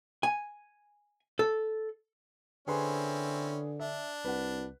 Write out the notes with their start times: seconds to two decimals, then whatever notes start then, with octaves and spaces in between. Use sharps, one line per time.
0.23 G#5
1.39 A4
2.68 D3 C4 C#4 E4 G#4 B4 C6
3.80 D4 E5
4.25 C2 B4 F#5